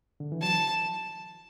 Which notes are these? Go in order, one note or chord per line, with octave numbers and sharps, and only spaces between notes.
D3
E3
F#3 A5